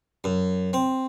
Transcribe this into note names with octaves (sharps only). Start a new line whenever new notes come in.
F#2
C4